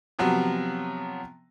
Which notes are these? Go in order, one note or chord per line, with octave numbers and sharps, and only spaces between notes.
C3 F3 F#3 B3